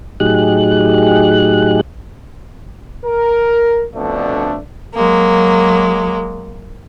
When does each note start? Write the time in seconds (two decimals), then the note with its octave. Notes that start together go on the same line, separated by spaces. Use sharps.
0.20 A2 F#3 D#4 G4 G#4 F#6
3.05 A#4
3.94 F2 B2 D3 A3 D4
4.94 F#3 G#3 A#3